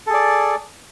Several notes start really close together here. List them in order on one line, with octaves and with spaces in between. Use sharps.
A4 G#4 D5